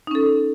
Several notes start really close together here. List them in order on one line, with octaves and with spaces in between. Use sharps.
D#4 C#4 A4